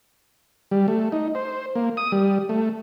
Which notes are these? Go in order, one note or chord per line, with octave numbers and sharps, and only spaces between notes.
G3
A3
D#4
C5
A#3
D#6
G3
A3